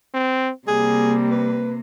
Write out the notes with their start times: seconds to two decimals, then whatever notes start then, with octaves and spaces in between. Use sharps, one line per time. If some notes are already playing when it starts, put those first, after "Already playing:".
0.14 C4
0.68 C3 G3 A#3 G#4
1.30 B4